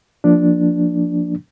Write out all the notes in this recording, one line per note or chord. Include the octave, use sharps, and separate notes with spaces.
F3 A#3 D4